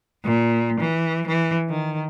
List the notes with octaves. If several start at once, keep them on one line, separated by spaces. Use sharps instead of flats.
A#2
E3
E3
D#3